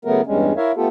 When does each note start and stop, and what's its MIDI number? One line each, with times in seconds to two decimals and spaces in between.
0.05 0.21 49
0.05 0.21 54
0.05 0.21 57
0.05 0.21 59
0.05 0.21 70
0.26 0.53 40
0.26 0.53 43
0.26 0.53 55
0.26 0.53 56
0.26 0.53 61
0.57 0.72 64
0.57 0.72 70
0.57 0.72 73
0.57 0.72 76
0.57 0.72 77
0.76 0.88 57
0.76 0.88 59
0.76 0.88 65
0.76 0.88 67
0.76 0.88 69